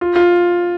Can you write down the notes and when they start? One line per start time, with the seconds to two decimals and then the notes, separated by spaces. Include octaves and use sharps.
0.01 F4
0.16 F4